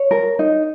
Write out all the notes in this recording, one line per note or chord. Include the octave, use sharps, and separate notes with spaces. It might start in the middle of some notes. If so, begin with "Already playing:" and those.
Already playing: C#5
A#4
D#4